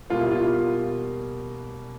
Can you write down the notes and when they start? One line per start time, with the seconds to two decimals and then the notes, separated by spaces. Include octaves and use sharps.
0.10 B2 G3 A#3 F4
0.20 E4
0.32 F4